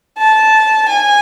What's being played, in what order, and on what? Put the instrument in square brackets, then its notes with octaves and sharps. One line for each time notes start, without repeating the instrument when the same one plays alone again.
[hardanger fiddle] A5
G#5